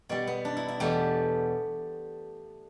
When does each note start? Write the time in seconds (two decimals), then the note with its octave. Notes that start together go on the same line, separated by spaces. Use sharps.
0.09 B2 G3 D5
0.27 B3
0.45 D4
0.57 E4
0.68 E4
0.80 E2 B2 A3 G4